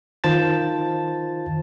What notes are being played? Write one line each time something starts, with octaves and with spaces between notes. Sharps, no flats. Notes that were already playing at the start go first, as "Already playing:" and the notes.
D#3 F4 C5 A5 A6